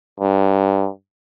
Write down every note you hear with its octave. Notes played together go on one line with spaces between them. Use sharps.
G2